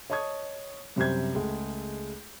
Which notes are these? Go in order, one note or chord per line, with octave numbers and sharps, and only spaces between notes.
C#5 D#5 A5 C#6 D#6 G#6
F#2 C3 G3 C5 G6 G#6
C#2 G#3 A3